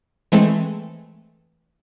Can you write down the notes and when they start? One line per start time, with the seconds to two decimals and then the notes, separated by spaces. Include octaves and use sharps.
0.32 E3 G#3 A3 C4